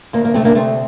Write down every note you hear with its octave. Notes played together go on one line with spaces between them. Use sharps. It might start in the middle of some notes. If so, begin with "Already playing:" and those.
D2 A#3
A#3
C3 A3 C4
A#3 D4
D2 A3 C4